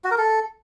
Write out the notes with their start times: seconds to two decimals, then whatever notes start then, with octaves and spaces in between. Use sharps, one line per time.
0.04 F#4
0.11 A#4
0.18 A4